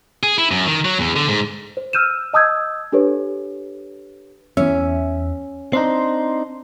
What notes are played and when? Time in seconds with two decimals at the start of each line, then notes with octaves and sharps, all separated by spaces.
0.23 G#4
0.38 E4
0.51 F#2
0.67 D#3
0.85 F#3
0.99 E2
1.16 D3
1.28 G#2
1.77 C5
1.93 E6 F6 G6 D#7 E7
2.34 D#5 A5 D#6 E6 G6 G#6
2.92 D4 G4 A4 B4 C#5
4.57 E2 C#4 E5
5.73 C4 D4 D#4 C6